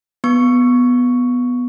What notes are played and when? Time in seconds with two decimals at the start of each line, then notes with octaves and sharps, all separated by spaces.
0.24 B3 C#6